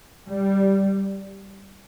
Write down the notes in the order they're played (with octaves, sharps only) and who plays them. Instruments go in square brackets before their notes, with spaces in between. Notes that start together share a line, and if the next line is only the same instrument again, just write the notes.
[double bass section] G3